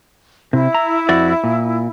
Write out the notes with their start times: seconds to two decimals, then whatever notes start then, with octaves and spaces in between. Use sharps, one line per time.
0.53 C3 E4
0.75 A#5
1.09 F2 F#4 D5
1.44 A#2